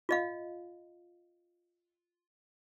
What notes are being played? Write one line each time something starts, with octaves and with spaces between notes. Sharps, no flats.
F4 D#5 F5